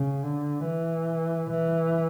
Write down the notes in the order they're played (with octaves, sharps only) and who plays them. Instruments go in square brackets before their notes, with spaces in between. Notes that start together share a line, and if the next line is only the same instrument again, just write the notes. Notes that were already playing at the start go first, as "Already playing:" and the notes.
Already playing: [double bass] C#3
D3
E3
E3